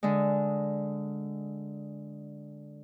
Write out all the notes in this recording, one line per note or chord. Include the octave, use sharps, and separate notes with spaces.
D3 G#3